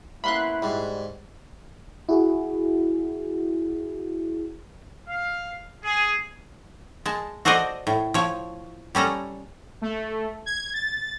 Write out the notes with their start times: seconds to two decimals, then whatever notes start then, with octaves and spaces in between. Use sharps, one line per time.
0.24 A#3 B3 C#4 E4 B5 C6 F#6
0.62 G#2 G3 F#4
2.09 E4 F#4 G#4
5.09 F5
5.84 G#4
7.06 G#3 A5
7.45 F#4 A4 C5 D5 D#5
7.87 A2
8.14 F3 C#5
8.95 G3 C#4 A4 A#5
9.82 A3
10.46 G#6
10.74 A6